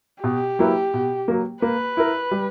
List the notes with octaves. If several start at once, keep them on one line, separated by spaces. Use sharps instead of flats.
B2 G4
F#3 A#3 E4 B4
B2
F#3 A#3
A#3 B4
E4 A#4
G3